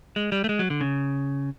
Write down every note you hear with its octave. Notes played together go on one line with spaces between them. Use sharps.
G#3
G3
A3
G#3
F#3
D3
C#3